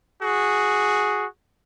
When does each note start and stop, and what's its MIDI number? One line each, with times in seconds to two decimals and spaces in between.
0.22 1.25 66
0.22 1.25 68